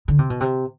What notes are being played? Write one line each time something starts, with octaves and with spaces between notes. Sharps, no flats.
D3
C3
B2
C3